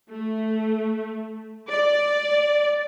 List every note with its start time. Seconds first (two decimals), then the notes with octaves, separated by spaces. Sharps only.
0.10 A3
1.69 D5